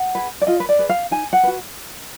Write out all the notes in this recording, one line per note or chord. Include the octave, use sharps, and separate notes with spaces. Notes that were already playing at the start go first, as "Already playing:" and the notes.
Already playing: F#5
G#4 B4
D5
F4 D#5
B4
D5
G#4 B4
F5
D#4 G#5
F#5
F#4 B4